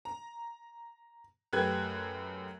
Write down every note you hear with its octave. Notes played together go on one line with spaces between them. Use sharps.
A#5
F#2 A3 G4 B4 F#6 G#6